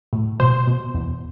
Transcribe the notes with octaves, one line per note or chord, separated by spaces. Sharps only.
A2
B2 C5
B2
E2